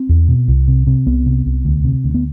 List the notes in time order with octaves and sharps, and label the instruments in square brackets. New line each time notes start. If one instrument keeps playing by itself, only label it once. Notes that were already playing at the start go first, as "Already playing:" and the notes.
Already playing: [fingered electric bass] C4
E2
B2
C2
C3
C3
C2 B3
C3
C2
D2
C3
D2
B3